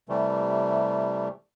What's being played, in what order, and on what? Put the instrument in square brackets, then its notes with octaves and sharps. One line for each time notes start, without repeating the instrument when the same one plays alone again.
[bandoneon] C3 E3 G3 A3